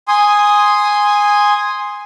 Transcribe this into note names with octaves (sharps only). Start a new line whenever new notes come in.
G#5 C6 D#6